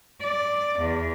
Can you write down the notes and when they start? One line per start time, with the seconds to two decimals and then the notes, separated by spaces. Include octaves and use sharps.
0.20 D5
0.79 E2